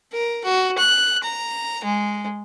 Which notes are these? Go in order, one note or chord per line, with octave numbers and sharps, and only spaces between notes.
A#4
F#4
F#6
A#5
G#3